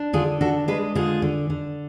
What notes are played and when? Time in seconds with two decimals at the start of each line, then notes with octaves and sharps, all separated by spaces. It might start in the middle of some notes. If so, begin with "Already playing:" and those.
Already playing: D4
0.13 D3 F4 G#4
0.41 D4 F#4 A4
0.68 G#3 G#4 B4
0.95 D3 F4 G#4
1.22 D3
1.50 D3